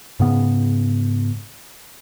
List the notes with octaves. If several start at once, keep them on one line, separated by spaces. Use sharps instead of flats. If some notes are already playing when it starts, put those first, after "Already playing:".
G#2 C#3 B3